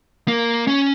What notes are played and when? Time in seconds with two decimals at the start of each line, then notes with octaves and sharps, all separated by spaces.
0.28 A#3
0.67 C#4